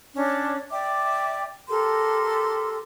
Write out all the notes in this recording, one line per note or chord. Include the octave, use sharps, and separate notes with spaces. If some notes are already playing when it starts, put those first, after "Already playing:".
C#4 D4 C#5
D5 E5 G5 D6
G4 A4 A#4 C6